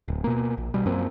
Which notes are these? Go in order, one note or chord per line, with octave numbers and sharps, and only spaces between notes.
D1
B2 A#3
A#1
B2 G3
F#2 F3 A#3 C4